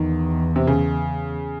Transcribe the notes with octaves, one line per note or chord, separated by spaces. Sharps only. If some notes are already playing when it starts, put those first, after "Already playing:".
Already playing: E2 D#3
C3
C#3